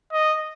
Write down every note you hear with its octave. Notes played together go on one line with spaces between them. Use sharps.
D#5